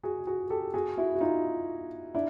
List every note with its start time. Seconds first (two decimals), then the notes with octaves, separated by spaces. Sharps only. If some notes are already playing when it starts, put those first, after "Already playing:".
0.03 F#4 G#4
0.27 F#4 G#4
0.50 G4 A4
0.74 F#4 G#4
0.97 E4 F#4
1.15 F#4
1.21 D#4 F4
2.15 D4 E4